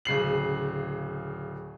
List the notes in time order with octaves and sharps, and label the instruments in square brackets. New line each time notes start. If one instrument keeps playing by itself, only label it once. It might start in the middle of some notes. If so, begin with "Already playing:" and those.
[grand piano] D1 C#3 C7 F#7